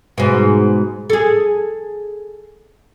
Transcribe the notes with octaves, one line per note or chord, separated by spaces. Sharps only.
G#2 B2
G#4 A4